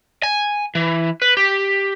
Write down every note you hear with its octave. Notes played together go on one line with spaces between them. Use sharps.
G#5
E3
B4
G4